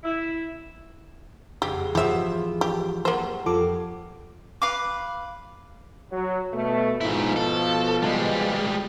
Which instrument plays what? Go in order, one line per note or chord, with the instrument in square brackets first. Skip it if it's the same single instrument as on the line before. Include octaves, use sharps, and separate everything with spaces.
[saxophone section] E4
[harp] F#1 F2 G#3 [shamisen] G4
[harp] E2 G#2 [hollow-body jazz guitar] E3 F3 [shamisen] G4 E5
[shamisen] G4
[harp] F#3 G3 G4 [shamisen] A#3 C5
[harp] F2 D7 [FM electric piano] F3 A4 D6
[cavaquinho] B4 F5 D6
[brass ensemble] F#3
B2 A3
[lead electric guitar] G#2 E4 [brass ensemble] B2 F3
[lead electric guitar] A4
G3 G#3